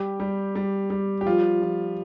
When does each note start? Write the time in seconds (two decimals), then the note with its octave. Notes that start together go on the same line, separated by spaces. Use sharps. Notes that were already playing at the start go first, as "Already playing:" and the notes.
Already playing: G3 G4
0.20 G3
0.55 G3
0.90 G3
1.21 G4
1.26 F3 F4
1.62 F3